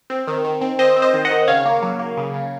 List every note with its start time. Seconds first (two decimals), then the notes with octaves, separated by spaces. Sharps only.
0.10 C4
0.28 D#3
0.44 D#3
0.61 C4
0.79 C4 C5 D#5
0.96 C4
1.02 C5 D#5
1.14 D#3
1.25 D#5 F#5
1.31 D#3
1.48 C#3 C#5 F5
1.65 A#3
1.82 F#3
1.99 A#3
2.17 C#3
2.34 C#3